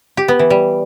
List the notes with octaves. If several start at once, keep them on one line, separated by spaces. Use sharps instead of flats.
G4
B3
E3
G3